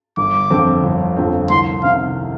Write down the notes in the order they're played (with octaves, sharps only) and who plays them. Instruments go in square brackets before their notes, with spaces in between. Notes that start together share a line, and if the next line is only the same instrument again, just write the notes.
[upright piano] G1 [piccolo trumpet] D6
[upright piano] F2 D3 F3 C4
G1
F2 D3 F3 C4
[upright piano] C2 [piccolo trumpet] C6
[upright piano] C3 D#3 [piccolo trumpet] F5